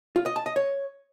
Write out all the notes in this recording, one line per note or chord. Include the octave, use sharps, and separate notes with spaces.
F4
D#5
A5
D#5
C#5